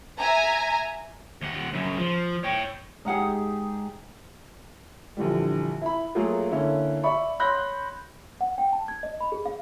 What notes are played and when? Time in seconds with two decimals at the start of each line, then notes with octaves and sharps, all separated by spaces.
0.18 E5 G#5 A#5
1.41 D#2 F#5
1.73 F#2 C#3
1.97 F3
2.44 C#5 G5
3.05 G#2 D#4 G4 G#4 F5 F#5
5.17 A#1 D3 E3 G3
5.82 E4 B5
6.15 F#3 A3 A#3 F4 G#4
6.51 D3 A#3 C#4 E4
7.03 D5 E5 B5 C#6
7.39 C#5 B5 C6 F#6 G6 A#6
8.41 F#5
8.58 G5
8.73 A5
8.88 G#6
9.03 D#5
9.21 B5
9.32 G#4
9.45 F5